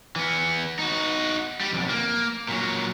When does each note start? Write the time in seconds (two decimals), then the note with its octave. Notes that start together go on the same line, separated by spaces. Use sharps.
0.16 E3 B3
0.79 D#4 F#4
1.61 G3 G4
1.73 B1 F2
1.89 A#3
2.48 A#2 F#3